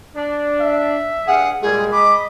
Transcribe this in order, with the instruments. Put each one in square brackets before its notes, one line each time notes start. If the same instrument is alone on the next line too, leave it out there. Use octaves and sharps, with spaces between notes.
[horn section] D4
[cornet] E5
[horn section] G2 G#4 F5 [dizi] F#5
[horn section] A#2 G3 [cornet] G#3 [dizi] G#4
[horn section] D#5 B5 [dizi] D6